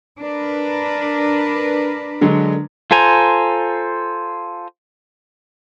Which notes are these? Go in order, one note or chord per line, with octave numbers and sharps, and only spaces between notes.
D4 A#4 B4
D3 F#3 G#3
F4 A4 C5 G#5 A#5